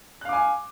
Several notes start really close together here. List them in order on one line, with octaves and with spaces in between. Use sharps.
F#6 F5 D6 G#5